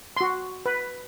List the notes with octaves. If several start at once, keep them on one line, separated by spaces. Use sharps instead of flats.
F#4 C6
B4